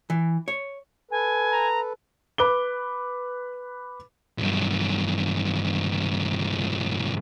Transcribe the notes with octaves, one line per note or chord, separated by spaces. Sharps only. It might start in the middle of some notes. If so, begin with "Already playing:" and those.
E3
C#5
A4 B4 G#5
A#5
B4 D6 G7
B1 G2